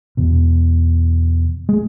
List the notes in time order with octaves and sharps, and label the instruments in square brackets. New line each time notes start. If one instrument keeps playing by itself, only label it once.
[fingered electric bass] E2 B2
G#3